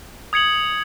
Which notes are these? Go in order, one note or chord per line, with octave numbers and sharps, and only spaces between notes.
D#6 G#6 C#7 F#7